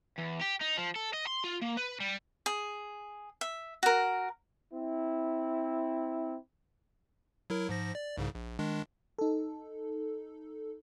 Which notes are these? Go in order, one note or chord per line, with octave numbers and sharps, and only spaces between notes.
E2
G4
D#4
F3
A4
D#5
C6
F4
A#3
B4
G3
G#4
E5
F#4 A#4
C4 E4
F#3 E4 A#4
G#2 F3 A#6
D5
C2 G#2 C#3
A#1
D#3 G#3 D4
D#4 A4